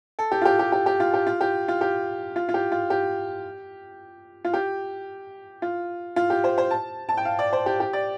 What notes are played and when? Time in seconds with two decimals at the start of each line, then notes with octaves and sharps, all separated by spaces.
0.19 A4
0.32 G4
0.42 F4
0.45 G4
0.59 G4
0.72 G4
0.86 G4
1.00 F4
1.14 G4
1.27 F4
1.41 G4
1.68 F4
1.81 G4
2.36 F4
2.49 F4
2.54 G4
2.72 F4
2.90 G4
4.44 F4
4.54 G4
5.62 F4
6.16 F4
6.30 G4
6.44 C5
6.58 C5
6.71 A5
7.09 A5
7.17 G5
7.25 F5
7.39 D5
7.53 C5
7.66 G4
7.80 G4
7.93 D5